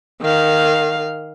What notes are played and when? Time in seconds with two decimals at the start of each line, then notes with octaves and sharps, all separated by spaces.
0.21 D#3 F5